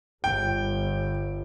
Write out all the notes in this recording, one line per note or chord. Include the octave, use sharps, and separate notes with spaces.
G1 G5